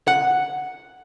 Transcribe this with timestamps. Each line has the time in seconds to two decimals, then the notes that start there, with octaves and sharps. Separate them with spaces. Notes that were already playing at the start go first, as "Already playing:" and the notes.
0.08 F#5